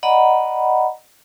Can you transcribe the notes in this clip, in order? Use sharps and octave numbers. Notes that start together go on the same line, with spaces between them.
D5 D#5 F#5 A#5 B5